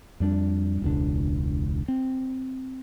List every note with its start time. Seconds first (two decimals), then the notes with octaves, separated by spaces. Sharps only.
0.20 F2 G3 D4
0.82 E1 C#2 D4
1.88 C4